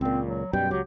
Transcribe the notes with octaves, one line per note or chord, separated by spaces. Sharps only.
C#2 A#2 C4
F#3
F#2 B2 G3 G5
C#2 F#3 G4